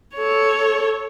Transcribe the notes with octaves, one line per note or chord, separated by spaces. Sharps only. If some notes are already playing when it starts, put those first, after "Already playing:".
A4 C#5